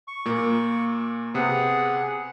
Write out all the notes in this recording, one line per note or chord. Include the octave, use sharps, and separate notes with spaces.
C#6
A#2 A#3
C3 B3 G#4 F#5